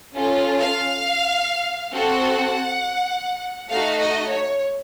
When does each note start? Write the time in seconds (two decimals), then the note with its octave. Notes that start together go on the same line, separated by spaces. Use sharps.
0.15 C#4 F4 A4
0.60 F5
1.92 C4 F#4 A4 F#5
3.69 A3 D#4 F#4 F5
3.99 D#5
4.30 C#5